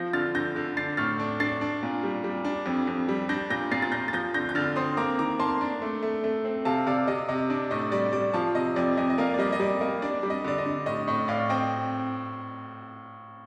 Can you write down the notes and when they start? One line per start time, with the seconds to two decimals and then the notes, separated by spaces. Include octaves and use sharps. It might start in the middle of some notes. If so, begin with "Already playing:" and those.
Already playing: F3 G6 A#6
0.13 D3 F6 A6
0.35 D3 G6 A#6
0.56 D3
0.77 D4 A6 C7
0.97 A2 F6 A6
1.19 D4
1.40 D4 A6 C7
1.61 D4
1.83 A#2
2.03 G3
2.24 G3
2.45 D4
2.66 F2
2.87 F2
3.09 G3
3.29 D4 G6 A#6
3.50 A#2 G6 A#6
3.71 A#2 A6 C7
3.82 A6
3.92 A#2 G6 A#6
4.08 A6
4.13 F3 G6 A#6
4.34 D3 G6 A#6
4.49 G6
4.55 D3 F6 A6
4.76 C4 C6 D#6
4.97 A#3 A#5 D6
5.19 D#3 A#5 D6
5.39 A#3 A5 C6
5.61 D4
5.82 A3
6.03 A3
6.24 A3
6.45 C4
6.65 C3 F5 A5
6.87 C3 D5 F5
7.08 C3 D#5
7.29 C3 D#5
7.50 D4 D5
7.71 A2 D#5
7.92 G3 D5
8.13 G3 D5
8.34 F3 F5 A5
8.55 C3 D#5
8.76 F2 D5
8.97 F2 D#5
9.10 D#5
9.18 A#3 D5 F5
9.34 D5
9.39 G3 D#5
9.53 D#5
9.60 G3 D5
9.81 A#3 D#5
10.02 D4 D5
10.23 G3
10.30 D#5
10.44 D3 D5
10.58 D#5
10.66 D3
10.86 A2 D#5
11.08 A2 D#5
11.28 A2 D5 F5
11.49 C4 D#5 G5